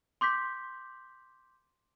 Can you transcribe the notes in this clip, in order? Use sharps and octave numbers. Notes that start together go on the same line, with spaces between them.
C6 D6 G6 B6